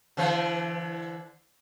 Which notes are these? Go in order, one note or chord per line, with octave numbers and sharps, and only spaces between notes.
D3 E3 C5